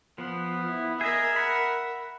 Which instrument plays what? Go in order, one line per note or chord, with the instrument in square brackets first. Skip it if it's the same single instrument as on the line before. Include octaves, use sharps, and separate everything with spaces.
[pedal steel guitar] F3 [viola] B3
[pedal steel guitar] E4
[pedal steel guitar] G#4 D#5 [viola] A#4 E5
[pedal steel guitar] F#5 B5